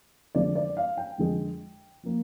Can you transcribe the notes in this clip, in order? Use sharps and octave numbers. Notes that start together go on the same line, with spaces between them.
F2 D3 G#3 D4 D5
D5
F5
G5
F2 D3 G#3
F3 A#3